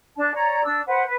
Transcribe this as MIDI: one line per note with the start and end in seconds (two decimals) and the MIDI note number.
0.16 0.31 62
0.16 0.31 81
0.33 0.63 73
0.33 0.63 74
0.33 0.63 82
0.64 0.81 62
0.64 0.81 88
0.87 1.04 71
0.87 1.04 72
0.87 1.04 78
1.05 1.16 71